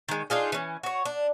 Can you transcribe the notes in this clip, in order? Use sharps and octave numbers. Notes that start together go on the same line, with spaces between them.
D#3 G#3
D4 D#4 F4 G#4
E3 C#4
F#4 C#5
D4